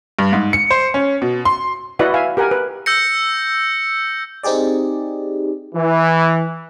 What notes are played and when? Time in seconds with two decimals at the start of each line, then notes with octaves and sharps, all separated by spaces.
0.19 G2
0.33 G#2
0.53 C#7
0.71 C5
0.94 C#4
1.22 B2
1.45 C6
1.99 E4 F#4 B4 D5 D#5 F#5
2.14 E5 F5 G#5
2.37 G4 A#4 F#5 G#5
2.51 B4
2.86 E6 G6 A#6 C#7
4.43 C4 D#4 G4 G#4 D5
5.75 E3